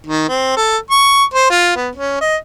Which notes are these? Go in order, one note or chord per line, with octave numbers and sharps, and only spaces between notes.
D#3
C4
A4
C#6
C5
F4
B3
C#4
D#5